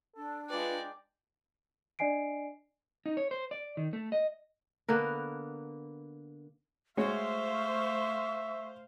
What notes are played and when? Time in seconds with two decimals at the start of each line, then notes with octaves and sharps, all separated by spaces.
0.16 D4 A4
0.49 G#3 F4 B4 D5 G5
1.99 D4 D5 D#5 G#5 C7 D7
3.06 D#4
3.17 C#5
3.31 C5
3.51 D5
3.77 D#3
3.93 A3
4.12 D#5
4.88 D3 A#3 B3 A#4
6.97 G#3 A3 F#4 C5 C#5 E5 F5 C#6